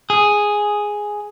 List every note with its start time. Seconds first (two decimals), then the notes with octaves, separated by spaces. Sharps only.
0.10 G#4